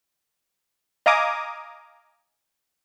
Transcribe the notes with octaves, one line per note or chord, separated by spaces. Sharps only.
D#5 F5 G#5 A#5 D6 D#6